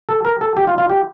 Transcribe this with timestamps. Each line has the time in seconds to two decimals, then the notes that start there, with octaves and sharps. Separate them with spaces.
0.09 A4
0.25 A#4
0.41 A4
0.57 G4
0.67 F4
0.78 F4
0.89 G4